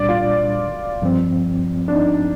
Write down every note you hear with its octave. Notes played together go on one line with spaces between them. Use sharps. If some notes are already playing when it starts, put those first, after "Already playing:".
Already playing: C2 A#2 G3 D4 D5
F4
G2 F3 C4
D4
D#4